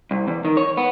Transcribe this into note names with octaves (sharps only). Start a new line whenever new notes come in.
C2
E2
D#3
C#5
B3